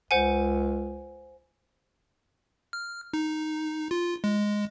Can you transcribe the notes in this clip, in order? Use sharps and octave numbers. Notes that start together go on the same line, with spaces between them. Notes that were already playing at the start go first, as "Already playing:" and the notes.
C#2 C5 F#5 G#5
F6
D#4
F4
G#3